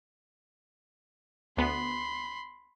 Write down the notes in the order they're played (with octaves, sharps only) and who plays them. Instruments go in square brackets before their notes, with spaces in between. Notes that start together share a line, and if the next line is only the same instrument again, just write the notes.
[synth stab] D2 B3 [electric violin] B5 C6